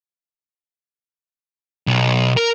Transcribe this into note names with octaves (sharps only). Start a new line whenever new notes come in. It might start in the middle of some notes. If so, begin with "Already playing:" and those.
B1
A#4